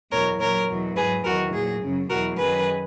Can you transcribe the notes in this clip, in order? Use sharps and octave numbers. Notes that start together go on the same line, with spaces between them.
E2 B2 F#3 A#4 C#5
A#2 F#3 A#4 C#5
E2 B2 F#3
G#2 F#3 G#4 B4
E2 D#3 F#3 F#4 A#4
A#2 F#3 G#4
F#2 C#3 F#3
E2 B2 F#3 F#4 A#4
F#2 D#3 F#3 G#4 B4